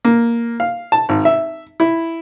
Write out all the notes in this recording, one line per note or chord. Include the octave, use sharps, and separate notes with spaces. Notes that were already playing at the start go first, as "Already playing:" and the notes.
A#3
F5
A5
G#1
E5
E4